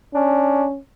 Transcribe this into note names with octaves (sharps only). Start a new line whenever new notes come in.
C#4 D4